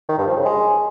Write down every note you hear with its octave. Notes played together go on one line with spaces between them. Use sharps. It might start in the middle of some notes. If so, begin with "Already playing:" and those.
D#3
G2
F3
C#3
G#3